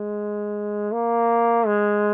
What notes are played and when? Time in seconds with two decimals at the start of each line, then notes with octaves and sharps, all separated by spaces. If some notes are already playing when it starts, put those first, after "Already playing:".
Already playing: G#3
0.92 A#3
1.67 G#3